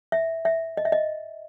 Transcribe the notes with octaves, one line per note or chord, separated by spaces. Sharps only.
E5
E5
D#5
E5
D#5